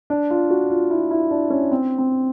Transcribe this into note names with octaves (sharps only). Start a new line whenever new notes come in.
D4
F4
F#4
F4
E4
E4
D4
C#4
C4
C4